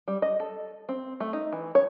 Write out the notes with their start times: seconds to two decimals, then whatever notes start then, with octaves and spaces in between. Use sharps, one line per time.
0.08 G3
0.22 D#5
0.40 A4
0.89 C4
1.20 A3
1.33 D#4
1.53 E3
1.75 C#5